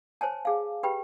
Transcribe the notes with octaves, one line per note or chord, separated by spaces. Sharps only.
C5 C#5 G#5 A5
G#4 F5
G4 B4 G5 B5